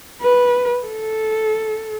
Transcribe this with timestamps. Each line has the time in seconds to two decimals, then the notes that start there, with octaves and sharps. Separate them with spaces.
0.22 B4
0.87 A4